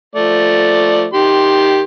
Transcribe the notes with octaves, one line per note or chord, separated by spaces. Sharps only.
F3 A3 D5
D#3 G4 C6